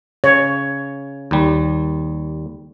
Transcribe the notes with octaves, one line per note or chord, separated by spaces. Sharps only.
C#3 C#5
D#2 G3